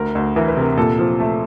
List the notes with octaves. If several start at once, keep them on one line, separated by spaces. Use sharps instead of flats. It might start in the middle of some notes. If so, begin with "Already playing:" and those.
Already playing: D2 A#4
D2
E3 A#4
B4
C3 A#4
A#2 A4
F3
A3